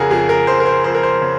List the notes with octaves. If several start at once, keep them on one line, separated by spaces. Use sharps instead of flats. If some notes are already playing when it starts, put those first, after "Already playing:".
Already playing: F2 C#3 G#4 A#4 F#5
F2 G#4
A#4
F2 C5
A#4
C5
F2 C5
A#4
C5
C#3